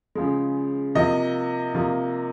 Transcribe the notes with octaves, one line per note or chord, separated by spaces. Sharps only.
C#3 F3 G#3
C3 F3 A#3 D#5
C3 F3 A#3